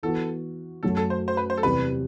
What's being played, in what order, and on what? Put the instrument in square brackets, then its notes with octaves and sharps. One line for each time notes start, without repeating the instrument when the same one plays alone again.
[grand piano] E3 B3 F#4 [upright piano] A4
[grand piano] F#2 F#3 A3 [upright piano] A4
[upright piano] A4
C5
C5
B4
C5
A4
[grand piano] E2 C3 G3 C4 G4 [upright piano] B4